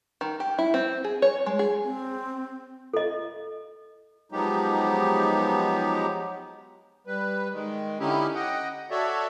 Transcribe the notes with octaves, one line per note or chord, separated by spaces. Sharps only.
D#3
G4
E4
C4
G#4
C#5
G#3
G#4
C4
A4 D#5
F3 F#3 G#3 B3 D#4 G4
G3 B4
D#3 G#3
D3 C#4 D#4 E4 G4
D#5 F#5 G5
F#4 A4 C#5 D5 E5